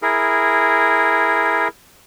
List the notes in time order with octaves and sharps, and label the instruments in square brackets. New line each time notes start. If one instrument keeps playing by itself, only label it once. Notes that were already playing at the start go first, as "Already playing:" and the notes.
[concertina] E4 G#4 A#4